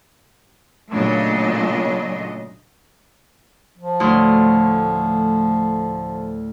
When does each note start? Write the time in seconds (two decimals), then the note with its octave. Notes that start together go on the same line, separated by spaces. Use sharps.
0.92 A#2 C#3 F#3 A3 D4 D#5
3.77 F3
4.00 D2 A2 C6